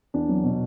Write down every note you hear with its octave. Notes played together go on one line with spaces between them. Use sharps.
E2 D4
F#3
B2